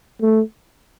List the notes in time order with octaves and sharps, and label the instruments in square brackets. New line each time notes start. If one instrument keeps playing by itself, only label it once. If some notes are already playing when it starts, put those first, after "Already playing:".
[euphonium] A3